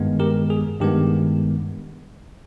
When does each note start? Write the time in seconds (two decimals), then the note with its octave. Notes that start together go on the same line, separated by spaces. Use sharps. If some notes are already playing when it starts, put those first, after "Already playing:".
Already playing: G2 D#3 G#3 B3
0.20 G4 A#4
0.50 G#4
0.80 G2 D#3 G#3 B3 G4